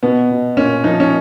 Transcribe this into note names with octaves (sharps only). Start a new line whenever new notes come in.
B2 B3
B2
A#2 C#4
F3 D#4
C#4